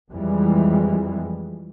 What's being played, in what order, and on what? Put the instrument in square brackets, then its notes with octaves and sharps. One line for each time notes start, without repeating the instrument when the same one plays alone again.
[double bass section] F2 E3 G3 G#3